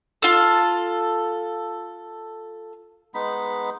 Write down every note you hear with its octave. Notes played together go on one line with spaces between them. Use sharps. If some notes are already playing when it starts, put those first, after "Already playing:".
F4 A4
G#3 B3 D#4 B5